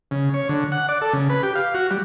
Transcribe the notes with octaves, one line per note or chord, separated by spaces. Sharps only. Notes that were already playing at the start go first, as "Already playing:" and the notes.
C#3
C#5
D3
F#5
D5
A4
C#3
B4
G4
F5
F#4
G3